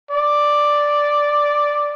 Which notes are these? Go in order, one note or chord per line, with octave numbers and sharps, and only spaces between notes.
D5